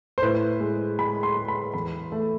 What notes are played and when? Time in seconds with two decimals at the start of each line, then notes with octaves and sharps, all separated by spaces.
0.18 C5
0.22 A2 B4
0.60 G#3
0.99 G#3 B5
1.23 C6
1.37 G#3
1.48 B5
1.74 E2 B5
2.12 A3